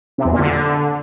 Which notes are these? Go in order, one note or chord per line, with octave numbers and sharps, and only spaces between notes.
C3
E2
A#2
D3